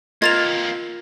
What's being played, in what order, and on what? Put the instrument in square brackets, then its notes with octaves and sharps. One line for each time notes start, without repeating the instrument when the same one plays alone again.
[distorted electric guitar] A#3 C4 [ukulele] F4 A#4 D#5 [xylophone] G#6 A6 F7